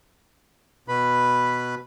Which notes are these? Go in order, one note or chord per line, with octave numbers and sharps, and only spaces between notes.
B2 B4 B5